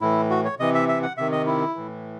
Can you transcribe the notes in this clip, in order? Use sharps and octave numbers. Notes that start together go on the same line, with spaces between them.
A2 E3 E4
F#4
C#5
C3 E3 D#5
E5
E5
F#5
C3 D#3 E5
D#5
E4
A2 E3